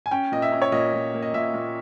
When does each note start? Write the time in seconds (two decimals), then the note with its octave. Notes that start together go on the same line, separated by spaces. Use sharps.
0.06 G#5
0.11 C#4 G5
0.32 A#2 D#5
0.42 E5
0.52 C#4
0.62 C#5
0.72 A#2 D#5
0.93 A#2
1.14 A#3
1.22 D#5
1.33 A#2 E5
1.54 A#2